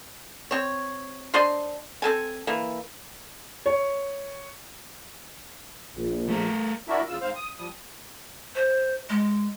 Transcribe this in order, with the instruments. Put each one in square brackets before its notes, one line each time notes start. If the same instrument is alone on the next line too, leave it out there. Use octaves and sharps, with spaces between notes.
[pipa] C4 C#5
D4 C5 D#5 C6
C4 A4 G#5
E3 A#3
[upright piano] C#5
[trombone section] A#1
[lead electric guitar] A3 A#4
[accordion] D4 E4 F#4 A#4 D5 E5
E2 C#3 F4 E6
G#2 C4 C5 F5
D#6
F3 G3 D#6
[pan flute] C5
G#3